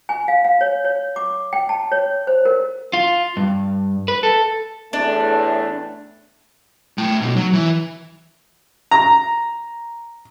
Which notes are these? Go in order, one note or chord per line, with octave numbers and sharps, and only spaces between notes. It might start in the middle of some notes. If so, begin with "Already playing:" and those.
G#5
F5
F5
C#5
C#5
D6
G5
A5
C#5
C5
A#4
F4
G2
B4
A4
E2 A2 A3 D4
A3 G5
B2 D#4
F#3
E3
A#5